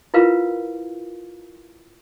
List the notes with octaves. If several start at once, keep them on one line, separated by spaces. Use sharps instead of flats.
E4 F4 A#4 B4 F5